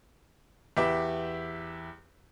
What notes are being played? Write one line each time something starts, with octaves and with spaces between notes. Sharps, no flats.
E2 G4 B4 E5 D6